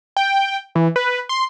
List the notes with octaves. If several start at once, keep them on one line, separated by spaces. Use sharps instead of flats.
G5
E3
B4
C6